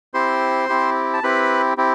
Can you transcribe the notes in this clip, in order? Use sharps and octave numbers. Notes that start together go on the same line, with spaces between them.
C4 E4 G4 C5 C6
C4 E4 G4
A5
C4 E4 G4 B4 B5
C4 E4 G4